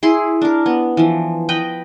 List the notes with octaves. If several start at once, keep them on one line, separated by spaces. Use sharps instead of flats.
E4 G#4 C6
D4 A#4
B3
E3 F3
B4 D#5 G5